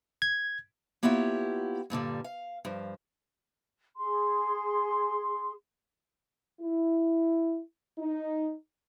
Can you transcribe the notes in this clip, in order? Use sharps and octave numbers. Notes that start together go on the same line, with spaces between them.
G#6
A#3 B3 E4 F4 G4 C#5
G2 A#2 D3 G3
F5
G2 F3
G#4 C6
E4
D#4